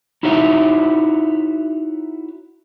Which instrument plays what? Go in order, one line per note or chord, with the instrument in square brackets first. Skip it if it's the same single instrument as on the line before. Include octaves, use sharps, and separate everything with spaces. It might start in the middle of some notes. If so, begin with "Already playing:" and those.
[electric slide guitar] D#4 E4 F#4 C#5 E5